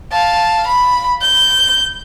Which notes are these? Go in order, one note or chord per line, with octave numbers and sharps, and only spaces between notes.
F5 A5
B5
G6